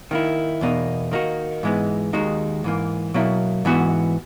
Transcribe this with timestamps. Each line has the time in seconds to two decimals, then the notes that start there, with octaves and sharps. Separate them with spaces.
0.11 D#3 A#3 E4
0.61 E2 B2 A#3 D#4
1.11 D#3 A#3 D#4 F#4
1.63 G#2 E3 G#3 B3 D#4
2.13 D#2 D#3 G#3 D#4 F#4
2.64 G#2 E3 A#3
3.14 B2 F#3 A#3 E4
3.65 G#2 E3 B3 F#4